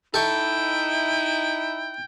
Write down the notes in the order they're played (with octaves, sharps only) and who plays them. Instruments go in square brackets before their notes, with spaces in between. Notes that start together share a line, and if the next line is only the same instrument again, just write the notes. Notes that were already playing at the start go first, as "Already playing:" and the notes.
[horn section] D#4 E4 [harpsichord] A4 C#6 [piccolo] G5